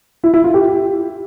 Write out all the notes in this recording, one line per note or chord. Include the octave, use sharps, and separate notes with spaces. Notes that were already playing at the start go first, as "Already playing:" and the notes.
E4
E4
F4
G4